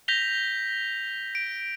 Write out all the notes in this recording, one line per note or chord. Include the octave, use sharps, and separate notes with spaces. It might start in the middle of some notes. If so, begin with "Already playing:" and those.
G6 A#6 B6 F7 G7
D7